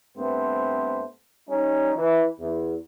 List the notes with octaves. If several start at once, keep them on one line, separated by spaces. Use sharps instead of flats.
G2 A3 B3 C4 C5
G3 C#4 D#4
E3
E2